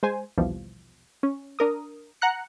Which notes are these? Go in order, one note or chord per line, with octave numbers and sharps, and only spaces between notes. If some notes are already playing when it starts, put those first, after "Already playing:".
G#3 C5 G#5
A#1 D#2 B2 E3 F3 G3
C#4
D4 A#4 D#6
F#5 A#5 F#6 C#7